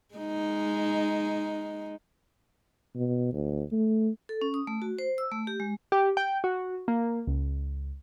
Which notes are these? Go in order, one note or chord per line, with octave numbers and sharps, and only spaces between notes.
G#3 D#4
B2
D2
A3
A4
C#4
D#6
A3
F#4
C5
E6
A3
G4
G#3
G4
G5
F#4
A#3
C#2